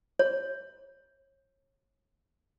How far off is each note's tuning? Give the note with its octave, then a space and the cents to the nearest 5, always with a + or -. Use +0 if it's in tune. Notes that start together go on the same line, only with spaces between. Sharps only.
C#5 -30